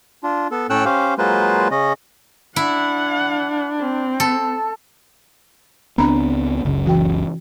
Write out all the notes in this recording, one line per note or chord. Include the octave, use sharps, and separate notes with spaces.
D4 F4
B3 A4
A2 C#4 A4 G5 E6 F#6
C#4 G4 C5 F5
F#3 G#3 A#3 F4 B4 C5
C#3 C#4 D#5
D4 E4 F#5
C4
A4
C#2 B3 C4 D4 A#5 B5
F#1 C#2 C#3
E3 F#4 G5